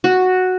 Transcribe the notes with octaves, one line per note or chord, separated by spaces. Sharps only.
F#4